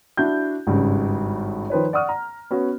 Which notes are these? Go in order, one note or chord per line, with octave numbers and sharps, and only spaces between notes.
D4 E4 F#4 G6
G#1 G2 C#3
D#3 F3 B4 C#5
D5 F#5 C#6 D#6 F6
A#5
B3 C#4 F#4